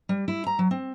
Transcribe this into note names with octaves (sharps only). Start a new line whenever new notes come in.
G3
E4
A#5
F#3
C4